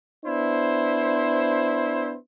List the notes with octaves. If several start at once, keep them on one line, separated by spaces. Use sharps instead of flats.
B3 D4 E4 C5